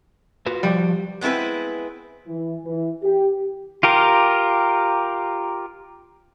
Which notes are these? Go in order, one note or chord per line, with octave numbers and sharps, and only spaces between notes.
F4 F#4 B4
F3 G3 F#4
G#3 B3 C4 E4 B4
E3
E3
G4
F4 G4 A#4